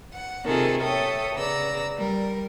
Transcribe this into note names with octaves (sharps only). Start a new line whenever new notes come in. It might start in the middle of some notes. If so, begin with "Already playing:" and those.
F#5
C3 D#3 C4 F4 G#4 A4
A4 C#5 E5 G5 D#6
C#3 B3 G#4 D5 A#5 E6
G3 A#4